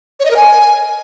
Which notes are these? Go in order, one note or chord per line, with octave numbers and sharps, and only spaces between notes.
C#5
D#5
A#4
G#5